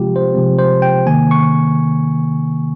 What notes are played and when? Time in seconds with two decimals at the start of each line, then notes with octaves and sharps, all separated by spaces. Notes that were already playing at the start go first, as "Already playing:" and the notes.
Already playing: C3 F3 G#3 C4 F4 G4
0.16 C5
0.34 C3 F3 G#3 C4
0.59 C5
0.82 G5
1.06 C3 D#3 A#3 G#5
1.31 C#6